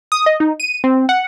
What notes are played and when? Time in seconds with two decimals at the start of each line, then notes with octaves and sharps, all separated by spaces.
0.12 D#6
0.26 D#5
0.40 D#4
0.60 D#7
0.84 C4
1.09 F#5